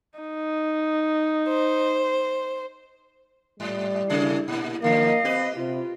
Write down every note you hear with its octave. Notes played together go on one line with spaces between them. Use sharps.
D#4
C5
G#2 G3
C3 A3 E4 G#4
A#2 A#3
G2 D3 F3 A#3 D#5 F5
C4 G4 B4
C3 F4